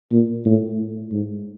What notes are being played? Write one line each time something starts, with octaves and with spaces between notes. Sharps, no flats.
A#2
A2
G#2